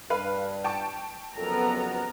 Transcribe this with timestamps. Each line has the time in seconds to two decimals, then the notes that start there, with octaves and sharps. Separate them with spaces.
0.10 G2 B4 F5 B5
0.64 G5 A5 C#6
1.38 F2 C#3 F#3 B3 A4 A#4 A#5